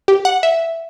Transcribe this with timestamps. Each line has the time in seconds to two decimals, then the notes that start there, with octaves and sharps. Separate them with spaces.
0.08 G4
0.25 F#5
0.43 E5